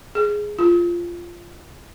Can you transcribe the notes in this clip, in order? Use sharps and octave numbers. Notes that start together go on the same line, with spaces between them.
G#4
F4